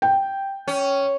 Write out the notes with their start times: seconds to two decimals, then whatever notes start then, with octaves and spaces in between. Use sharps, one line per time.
0.02 G5
0.68 C#4